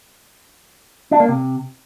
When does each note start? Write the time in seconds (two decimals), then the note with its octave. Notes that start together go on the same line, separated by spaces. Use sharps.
1.11 D4
1.20 A#3
1.29 C3